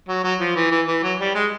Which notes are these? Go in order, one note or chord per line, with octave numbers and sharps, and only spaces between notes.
F#3
F#3
F3
E3
E3
E3
F#3
G3
G#3